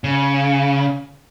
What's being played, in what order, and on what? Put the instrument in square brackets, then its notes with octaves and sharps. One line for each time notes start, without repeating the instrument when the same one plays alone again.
[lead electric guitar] C#3